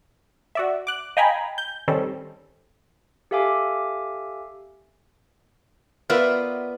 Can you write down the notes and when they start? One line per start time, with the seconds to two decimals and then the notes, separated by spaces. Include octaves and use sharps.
0.55 F#4 D5 E5
0.87 D6 F#6
1.17 D#5 F5 G5 G#5 A#5 B5
1.58 G6
1.88 D#3 G3 C4 C#4 A4
3.31 G4 A4 E5 F5 G#5 D6
6.10 B3 F4 A#4 B4 D5 E5